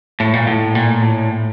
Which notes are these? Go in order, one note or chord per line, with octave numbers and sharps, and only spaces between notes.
A2
A#2
A2
A#2
A2